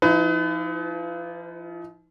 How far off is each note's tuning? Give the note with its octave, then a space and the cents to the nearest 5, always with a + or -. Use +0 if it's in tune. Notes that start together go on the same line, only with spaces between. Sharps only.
F3 -25 D#4 +35 B4 +35